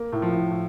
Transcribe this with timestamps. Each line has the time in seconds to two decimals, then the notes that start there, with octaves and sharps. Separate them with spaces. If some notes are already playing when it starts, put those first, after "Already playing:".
Already playing: A#3
0.12 A2
0.22 F3
0.32 A2
0.51 A2